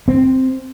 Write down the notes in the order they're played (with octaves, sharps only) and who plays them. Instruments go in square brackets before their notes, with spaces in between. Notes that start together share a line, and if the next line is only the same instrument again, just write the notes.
[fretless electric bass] C4